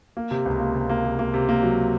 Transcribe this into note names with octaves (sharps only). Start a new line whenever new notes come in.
A#3
C3
C#2
A#3
C3
A#3
C3
A#3
C3
A#3
F#3